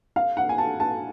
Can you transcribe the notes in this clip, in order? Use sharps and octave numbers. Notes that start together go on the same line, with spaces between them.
F5
F#5
G#5
A5
A5